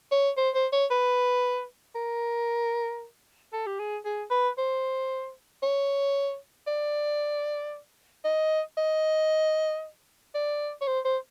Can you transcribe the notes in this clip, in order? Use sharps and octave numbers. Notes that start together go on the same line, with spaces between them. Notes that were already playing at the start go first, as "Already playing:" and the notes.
C#5
C5
C5
C#5
B4
A#4
A4
G4
G#4
G#4
B4
C5
C#5
D5
D#5
D#5
D5
C#5
C5
C5